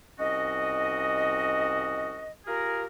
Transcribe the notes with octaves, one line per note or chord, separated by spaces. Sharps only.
C2 C#4 F#4 D#5
F4 G4 G#4 A#4